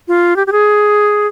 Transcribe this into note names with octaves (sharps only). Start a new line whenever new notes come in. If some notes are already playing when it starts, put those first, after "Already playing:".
F4
G4
G4
G#4